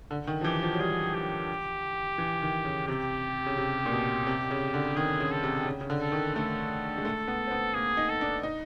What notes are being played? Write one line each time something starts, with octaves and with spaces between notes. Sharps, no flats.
D3
D#3
F3
E3 G4
F3
F#3
G3 G#4
G4
E3
D#3
C#3
C3 G4
C#3
C3
A#2
B2
C3
C#3
D3
D#3 G#4
C#3
A4
C3
C#3
C#3
D3
A4
D#3
A3 A4
G#3
A3
B3
C4
B3
A#3 G#4
D#4
A4
D4
D#4